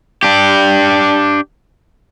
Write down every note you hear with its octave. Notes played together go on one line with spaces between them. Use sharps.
D4 G4